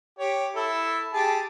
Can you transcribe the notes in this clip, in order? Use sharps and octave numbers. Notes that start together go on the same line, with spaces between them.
G4 C#5
E4 A4
G4 G#4 A5